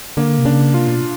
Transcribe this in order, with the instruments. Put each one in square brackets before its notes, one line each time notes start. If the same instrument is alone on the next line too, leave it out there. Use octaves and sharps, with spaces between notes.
[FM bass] D3 [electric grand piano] A#3
[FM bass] C3
[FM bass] C#3 [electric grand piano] D4
[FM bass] C3 [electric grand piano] F4
[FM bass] B2